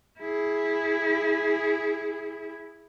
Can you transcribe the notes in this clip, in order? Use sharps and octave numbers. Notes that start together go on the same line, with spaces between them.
E4 G#4